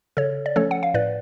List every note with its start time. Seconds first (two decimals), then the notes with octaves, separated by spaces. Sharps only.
0.17 C#3 A4 C#5
0.46 D5
0.56 F3 A3 C#4 A4 C#5
0.71 F#5
0.83 F5
0.94 A2 B4 D5